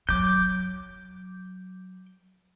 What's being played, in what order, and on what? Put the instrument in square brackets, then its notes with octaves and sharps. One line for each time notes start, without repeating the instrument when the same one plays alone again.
[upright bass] F#3 [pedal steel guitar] D6 G6